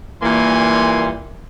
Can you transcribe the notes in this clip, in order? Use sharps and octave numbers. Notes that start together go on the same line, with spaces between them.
A#2 E3 G3 A#3 G#5 C6